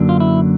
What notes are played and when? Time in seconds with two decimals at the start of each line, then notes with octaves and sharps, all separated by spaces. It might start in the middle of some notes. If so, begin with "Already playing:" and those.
Already playing: F#2 D3 F#3 A#3 D4
0.09 F4
0.20 E4